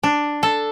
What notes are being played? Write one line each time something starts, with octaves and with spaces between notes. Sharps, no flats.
D4
A4